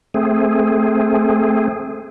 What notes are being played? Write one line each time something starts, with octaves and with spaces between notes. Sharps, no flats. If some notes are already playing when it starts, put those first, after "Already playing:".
A3 C4 G#4